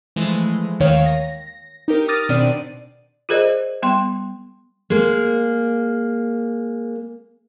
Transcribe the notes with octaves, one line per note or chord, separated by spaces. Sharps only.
E3 F3 G#3 A3
D#2 D#3 C#5 F5
A#6
D#4 G4 A#4
D6 D#6 F6 A6 A#6 D#7
B2 D#3 C4 D4 D5 D#7
F4 G#4 A#4 C5 D5 D#5
G3 B3 G5 C6
G#3 A#3